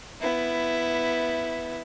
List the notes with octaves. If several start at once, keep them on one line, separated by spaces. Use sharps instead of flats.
B3 E4